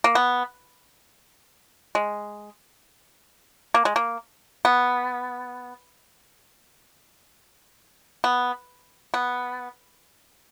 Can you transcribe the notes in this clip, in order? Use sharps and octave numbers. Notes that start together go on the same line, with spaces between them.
A#3
B3
G#3
A#3
G#3
A#3
B3
B3
B3